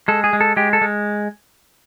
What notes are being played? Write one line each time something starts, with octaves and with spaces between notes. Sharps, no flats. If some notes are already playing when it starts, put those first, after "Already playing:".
G#3 A4
G#4
G#3
A4
G#3 G4
A4
G#3